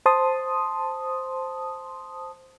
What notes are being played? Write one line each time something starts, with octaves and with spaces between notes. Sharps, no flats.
C5 A5 C6 D#6